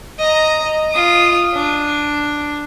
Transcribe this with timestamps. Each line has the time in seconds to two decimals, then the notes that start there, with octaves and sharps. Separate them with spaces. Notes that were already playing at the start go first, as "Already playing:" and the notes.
0.19 D#5 A#5
0.92 F4 D#6
1.54 D4